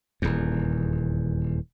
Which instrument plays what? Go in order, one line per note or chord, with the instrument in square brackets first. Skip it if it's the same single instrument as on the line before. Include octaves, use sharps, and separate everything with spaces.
[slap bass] D#1 E2